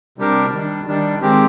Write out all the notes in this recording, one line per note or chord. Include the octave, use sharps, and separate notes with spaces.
C3 G3 D4 G4 A#4
D#3 G3 D4
D#3 G3 D4
D#3 G#3 C4 G4